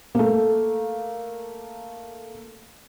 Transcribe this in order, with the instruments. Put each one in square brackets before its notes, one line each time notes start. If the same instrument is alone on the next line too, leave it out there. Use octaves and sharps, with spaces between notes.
[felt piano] A3 A#3